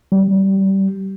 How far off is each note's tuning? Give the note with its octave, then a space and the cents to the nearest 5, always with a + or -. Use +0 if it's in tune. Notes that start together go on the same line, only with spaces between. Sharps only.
G3 -20